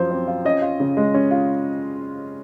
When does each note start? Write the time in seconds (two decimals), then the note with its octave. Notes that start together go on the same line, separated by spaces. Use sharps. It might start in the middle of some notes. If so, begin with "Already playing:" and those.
Already playing: F#2 F3 F4 C5
0.10 C4
0.28 F4
0.45 C#4 D#5
0.62 F4
0.80 C#3
0.97 G#3
1.14 C#4
1.31 F4